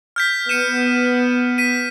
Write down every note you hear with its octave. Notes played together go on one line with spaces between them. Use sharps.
F6 G6 B6
B3 C#7 D#7 E7
B6 D#7